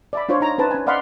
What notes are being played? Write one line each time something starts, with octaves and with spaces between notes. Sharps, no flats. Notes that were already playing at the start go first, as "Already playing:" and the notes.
D5 E5 B5
D4 F4 C5 C#5
D#4 A#5
C#4 D#4 B4 C5 A5
C#4 G#5
D5 D#5 F5 F#5 B5 C6